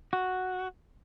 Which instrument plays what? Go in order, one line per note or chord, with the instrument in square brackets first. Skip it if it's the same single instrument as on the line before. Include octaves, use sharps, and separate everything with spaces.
[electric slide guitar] F#4